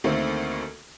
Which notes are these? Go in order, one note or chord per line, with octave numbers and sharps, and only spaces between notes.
D2 D#3 A3 A#3 C4